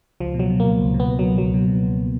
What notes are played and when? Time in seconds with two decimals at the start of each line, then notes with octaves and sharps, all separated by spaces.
0.20 C#2 F3
0.34 B2
0.39 F#3
0.50 B2
0.60 C#2 A#3
0.80 C#2
0.94 B2
1.00 B3
1.09 B2
1.19 C#2 F#3
1.38 C#2 F#3
1.54 B2
1.68 B2
1.83 C#2